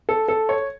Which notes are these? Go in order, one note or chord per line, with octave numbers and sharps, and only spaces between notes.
A4
A4
C#5